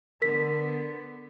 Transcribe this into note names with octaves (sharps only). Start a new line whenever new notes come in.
D3 B3 A#4 B6